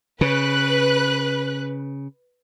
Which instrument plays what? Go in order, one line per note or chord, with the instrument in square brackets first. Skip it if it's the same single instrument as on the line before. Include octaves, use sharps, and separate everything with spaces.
[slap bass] C#3 [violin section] B4 F#6